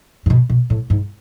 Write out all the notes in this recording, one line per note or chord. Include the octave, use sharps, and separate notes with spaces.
A2
B2
B2
A2
G#2